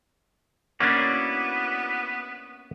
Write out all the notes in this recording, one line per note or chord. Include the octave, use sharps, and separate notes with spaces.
A#3 B3 C#4 D4 E4 F#4 D5